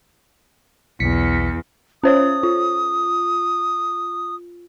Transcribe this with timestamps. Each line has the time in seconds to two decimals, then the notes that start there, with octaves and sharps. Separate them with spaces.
1.00 B1 E2 B6 C#7
2.04 C#4 C5 C#5 D#6
2.43 F4